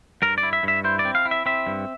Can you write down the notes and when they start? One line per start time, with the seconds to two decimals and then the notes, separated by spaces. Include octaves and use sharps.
0.22 G2 A#4
0.38 D5
0.43 E4
0.53 E5
0.63 G2 E5
0.84 E4 C5
0.99 D5
1.05 C4
1.15 F5
1.25 E4
1.31 E5
1.46 C4 E5
1.67 G2